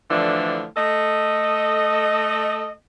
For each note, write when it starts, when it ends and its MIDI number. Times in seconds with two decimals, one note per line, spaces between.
0.10 0.65 45
0.10 0.65 50
0.10 0.65 52
0.10 0.65 53
0.10 0.65 62
0.76 2.70 57
0.76 2.70 69
0.76 2.70 75